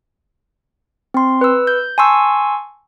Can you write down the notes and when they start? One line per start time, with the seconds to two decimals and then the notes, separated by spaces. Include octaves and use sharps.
1.14 C4 C6
1.41 B4 E6
1.67 G6
1.98 G#5 A5 C6 C#6 E6